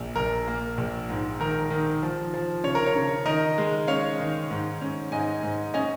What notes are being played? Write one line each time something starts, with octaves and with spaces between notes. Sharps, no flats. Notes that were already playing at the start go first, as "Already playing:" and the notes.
Already playing: A#1 A#3
A#1 A#4
A#3
A#1
G#2
D#3 A#4
D#3
F3
F3
C#3 C#5
A#4
C#5
C#3
D#3 A#4 D#5
G#3
C#4 C#5 F5
D#3
G#2
C#4
G#2 D#5 G#5
G#2
C#4 D#5 G#5